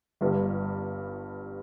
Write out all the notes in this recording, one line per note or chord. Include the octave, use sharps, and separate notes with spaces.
G1 G2 G3